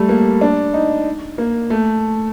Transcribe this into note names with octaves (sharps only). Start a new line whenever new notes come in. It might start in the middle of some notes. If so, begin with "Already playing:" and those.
Already playing: G3 A3
A#3
D4
D#4
A#3
A3